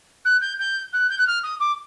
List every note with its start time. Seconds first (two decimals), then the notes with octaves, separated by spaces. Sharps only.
0.25 F#6
0.41 G6
0.59 G6
0.93 F#6
1.10 G6
1.18 F#6
1.27 F6
1.43 D#6
1.60 D6